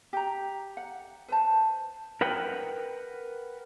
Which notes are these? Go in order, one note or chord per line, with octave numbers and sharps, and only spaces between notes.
G4 A#5
F#5
B4 C5 A5
A#4 B4 F#5 G5